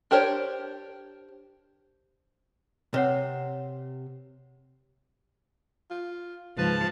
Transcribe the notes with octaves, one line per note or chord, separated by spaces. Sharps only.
D4 G4 A#4 C5 C#5
C3 B4 C#5 F#5
F4
C#2 G#2 F3 B4 A5